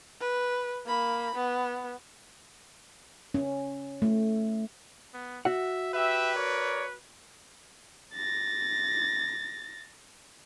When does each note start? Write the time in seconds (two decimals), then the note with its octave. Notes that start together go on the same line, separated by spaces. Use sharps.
0.21 B4
0.86 A#3 B5
1.35 B3
3.34 C#4
4.02 A3
5.14 B3
5.45 F#4 E5 F#5
5.93 G4 B4 E5
6.35 A#4 C#5 D5
8.15 A6 A#6